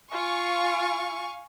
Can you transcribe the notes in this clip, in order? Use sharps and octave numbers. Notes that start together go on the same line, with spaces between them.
F4 F5 G#5 C#6